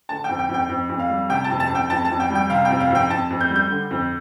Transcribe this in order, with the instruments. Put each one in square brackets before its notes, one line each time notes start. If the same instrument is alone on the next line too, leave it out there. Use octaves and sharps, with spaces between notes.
[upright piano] D3 A5
F2 G5
G5
F2
G5
F2
F2
F5
G3
C3 G5
A5
F2
A5
F2
G5
F2 A5
F2 A5
G5
G3
G5
C3 F5
F2 G5
F5
F2 G5
F2 A5
F2
G6
G3
G6
D3
F2